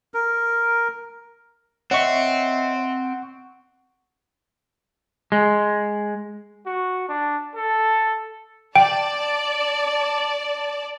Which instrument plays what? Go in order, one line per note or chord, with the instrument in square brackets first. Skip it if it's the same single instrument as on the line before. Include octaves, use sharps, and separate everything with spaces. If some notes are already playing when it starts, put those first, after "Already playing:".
[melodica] A#4
[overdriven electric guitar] C4 [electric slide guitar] C#5 D#5 E5 [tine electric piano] F#5 C#6
[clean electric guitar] G#3
[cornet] F#4
D4
A4
[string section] D5 A5 [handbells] G5